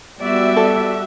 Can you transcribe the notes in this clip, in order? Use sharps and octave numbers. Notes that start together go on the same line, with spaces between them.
G3 B3 F#4 G4 D5 E5
A4